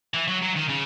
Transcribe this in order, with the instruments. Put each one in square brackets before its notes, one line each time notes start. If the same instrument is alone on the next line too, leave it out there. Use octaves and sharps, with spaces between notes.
[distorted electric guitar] E3
F#3
F#3
D#3
C#3